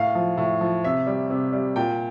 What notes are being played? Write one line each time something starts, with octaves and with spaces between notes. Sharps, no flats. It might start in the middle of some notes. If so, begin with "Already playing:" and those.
Already playing: A2 F5
F3
A2
F3
C3 E5
G3
C3
G3
A#2 G5